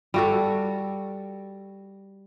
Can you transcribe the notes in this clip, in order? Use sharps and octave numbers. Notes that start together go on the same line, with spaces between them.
G3 F#4 A4